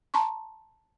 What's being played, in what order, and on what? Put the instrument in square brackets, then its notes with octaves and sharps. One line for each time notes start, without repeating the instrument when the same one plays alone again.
[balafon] A5 A#5 C6 C#6